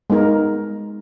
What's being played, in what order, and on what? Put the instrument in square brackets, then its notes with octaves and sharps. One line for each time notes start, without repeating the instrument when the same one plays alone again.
[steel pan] G#3 B3 D#4 A#4